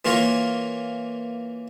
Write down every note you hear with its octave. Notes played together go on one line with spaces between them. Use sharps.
E3 A#3 F4 A#4 C#5